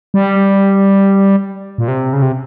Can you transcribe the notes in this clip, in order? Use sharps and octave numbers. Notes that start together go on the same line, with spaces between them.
G3
A#2
C3
C#3
C3